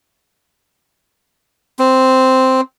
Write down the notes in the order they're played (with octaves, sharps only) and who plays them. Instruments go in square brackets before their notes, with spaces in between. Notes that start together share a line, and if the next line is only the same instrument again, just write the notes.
[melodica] C4